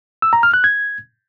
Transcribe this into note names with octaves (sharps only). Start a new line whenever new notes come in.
E6
A#5
F6
F#6
G#6